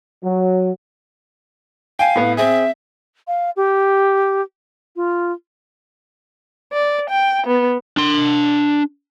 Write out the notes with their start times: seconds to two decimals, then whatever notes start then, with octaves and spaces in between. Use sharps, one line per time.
0.23 F#3
1.99 F5 G5 G#5
2.16 A2 B3
2.37 C4 G#4 E5
3.27 F5
3.56 G4
4.96 F4
6.73 D5
7.10 G5
7.46 B3
7.97 D4 C6